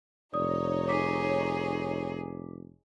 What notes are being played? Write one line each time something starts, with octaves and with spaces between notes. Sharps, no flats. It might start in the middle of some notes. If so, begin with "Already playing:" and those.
F1 D#4 C#5 D5 D#6
G#4 D6 B6